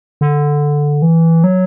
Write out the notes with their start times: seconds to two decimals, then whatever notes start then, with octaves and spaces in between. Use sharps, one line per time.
0.21 D3
1.02 E3
1.44 F#3